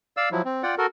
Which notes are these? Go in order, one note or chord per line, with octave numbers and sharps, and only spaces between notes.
D5 F5 E6
F3 F#3 E4
C4
F4 D5 F#5 G5
F#4 A4 A#4